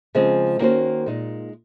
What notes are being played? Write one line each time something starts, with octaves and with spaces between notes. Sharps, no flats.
C#3 F3 G#3 C4
D#3 A#3 C#4 F#4 C5
A#2 G#3 D#4